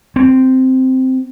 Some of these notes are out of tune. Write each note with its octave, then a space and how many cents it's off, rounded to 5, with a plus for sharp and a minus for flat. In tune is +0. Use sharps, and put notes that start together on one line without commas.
C4 -5